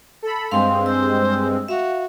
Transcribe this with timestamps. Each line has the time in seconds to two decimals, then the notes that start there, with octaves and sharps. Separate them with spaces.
0.23 A4 B5
0.51 G2 G#3 C4 F5 C6
0.86 C5 E6
1.68 F#4 E5 F5